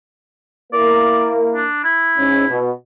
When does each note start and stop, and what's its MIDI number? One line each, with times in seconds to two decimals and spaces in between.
0.73 1.65 58
0.73 1.65 64
0.73 1.65 70
0.73 1.32 74
1.55 1.79 62
1.84 2.60 64
2.17 2.46 44
2.17 2.46 61
2.49 2.70 47